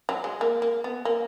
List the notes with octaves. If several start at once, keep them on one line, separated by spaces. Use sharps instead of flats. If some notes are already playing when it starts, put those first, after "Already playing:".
F#3
G#3
A#3
A#3
B3
A#3